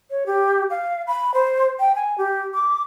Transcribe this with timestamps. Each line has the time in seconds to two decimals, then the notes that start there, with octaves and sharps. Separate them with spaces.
0.11 C#5
0.26 G4
0.70 F5
1.07 B5
1.34 C5
1.79 G5
1.95 G#5
2.18 G4
2.54 D6